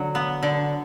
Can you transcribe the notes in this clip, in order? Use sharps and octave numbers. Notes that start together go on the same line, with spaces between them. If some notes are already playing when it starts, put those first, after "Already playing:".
Already playing: D3 F#3
B3
D3